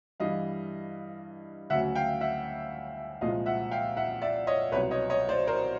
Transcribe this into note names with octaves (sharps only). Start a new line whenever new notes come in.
G2 E3 G3 D#5 F5
D2 C#3 F#3 E5 F#5
F5 G5
E5 F#5
C2 A#2 F3 G#3 D#5 F5
E5 F#5
F5 G5
E5 F#5
D5 E5
C#5 D#5
C2 B2 F#3 B4 C#5
C#5 D#5
C#5 D#5
C5 D5
A#4 C5